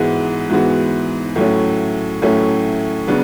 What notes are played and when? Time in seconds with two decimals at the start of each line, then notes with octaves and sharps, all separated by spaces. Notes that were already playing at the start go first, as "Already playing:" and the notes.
Already playing: G#2 E3 G#3 B3 F#4
0.49 G#2 E3 G#3 B3 F#4
1.36 A2 F#3 A3 C#4
2.22 A2 F#3 A3 C#4
3.07 C#3 F#3 B3 D4